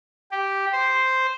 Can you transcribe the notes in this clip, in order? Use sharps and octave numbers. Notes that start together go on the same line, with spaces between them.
G4
C5